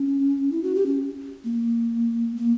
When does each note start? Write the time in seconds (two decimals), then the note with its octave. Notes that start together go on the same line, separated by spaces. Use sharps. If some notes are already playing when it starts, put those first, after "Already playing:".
Already playing: C#4
0.52 E4
0.63 F#4
0.75 G4
0.86 C#4
1.44 A#3
2.36 A#3